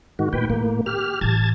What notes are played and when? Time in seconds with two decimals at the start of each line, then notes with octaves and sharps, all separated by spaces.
0.19 G#2 D#3 F#4
0.33 A#2 A3 B4 G5
0.50 A2 D#3 A#3
0.86 G4 F6
1.21 A2 E3 A5 G#6 A6